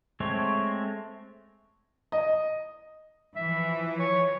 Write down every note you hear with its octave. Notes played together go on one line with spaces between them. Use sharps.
G#3 A3 C4 C#5
D#5
E3 F3 E5
C#5